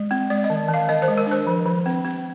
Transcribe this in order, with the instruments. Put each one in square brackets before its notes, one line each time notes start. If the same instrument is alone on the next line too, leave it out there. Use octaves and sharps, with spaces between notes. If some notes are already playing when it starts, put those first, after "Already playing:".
Already playing: [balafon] G#3
C4
G#3 D5
D#5
D#3
D#3
F5
D#3 D#5
C5
G#3
A#4
D4 C5
F3
F3
C4
C4